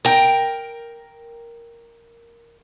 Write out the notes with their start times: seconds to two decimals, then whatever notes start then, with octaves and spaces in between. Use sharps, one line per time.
0.05 A#4 G5